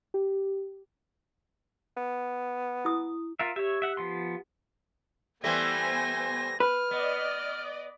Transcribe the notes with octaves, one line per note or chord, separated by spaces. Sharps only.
G4
B3
E4 D#6
F4 A#4 E5
G4 C#5 E5
E5 F#5
F3 B3 C6
E3 G3 A3 B3 C5 G#5 A#6
B4 F6
B3 D5 D#5